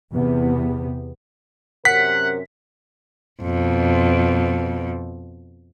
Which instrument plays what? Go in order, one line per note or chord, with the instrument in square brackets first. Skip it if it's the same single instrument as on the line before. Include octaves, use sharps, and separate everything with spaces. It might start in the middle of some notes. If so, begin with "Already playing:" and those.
[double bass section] E2 C3 B3
[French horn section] F#2 C3 A#4 [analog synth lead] F#5 [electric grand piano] B6
[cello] F2 B2